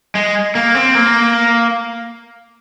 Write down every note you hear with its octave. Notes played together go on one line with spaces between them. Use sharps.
G#3
A#3
C4
A#3